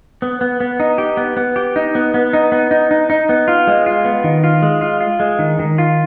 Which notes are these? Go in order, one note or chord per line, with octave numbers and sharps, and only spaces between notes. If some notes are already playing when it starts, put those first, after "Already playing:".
B3
B3
B3
D#4
G4
B3
B3
G4
D#4
B3
B3
D#4
B3
D#4
D#4
D#4
B3
F4
G#3
F4
B3
D#3
F4
G#3
F4
F4
G#3
D#3
D#3
F4